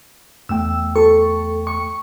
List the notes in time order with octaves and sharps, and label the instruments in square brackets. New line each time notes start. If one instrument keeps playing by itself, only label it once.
[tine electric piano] E2 A3 G5 [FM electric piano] E6
[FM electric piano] A4 C#6
C#6